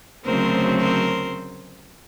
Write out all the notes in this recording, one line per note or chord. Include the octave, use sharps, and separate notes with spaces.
D2 C#3 F#3 A3 C4 A#4 C5
A#4 C5